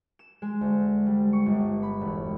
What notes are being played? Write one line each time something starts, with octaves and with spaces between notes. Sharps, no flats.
E7
G#3
D2
G3
C#6
G1
B5
E1